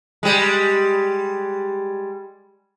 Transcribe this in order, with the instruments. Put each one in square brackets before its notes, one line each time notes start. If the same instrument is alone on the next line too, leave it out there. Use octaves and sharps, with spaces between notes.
[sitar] G3 G#3